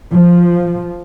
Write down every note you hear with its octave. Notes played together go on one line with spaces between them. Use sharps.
F3